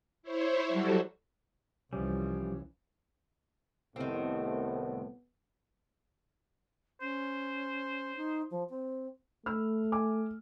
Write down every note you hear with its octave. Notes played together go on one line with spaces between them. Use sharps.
E4 C5 C#5
F#3 G3 F#4 A4
C2 E3 F3 G3 C#4
C2 A2 D#3 B3 C4
C#4 C5
D#4
F3
C4
A3 B5 E6 F6
G#5 D6